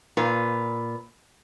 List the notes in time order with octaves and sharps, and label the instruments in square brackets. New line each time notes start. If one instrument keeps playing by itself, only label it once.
[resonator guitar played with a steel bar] A#2 F4 B4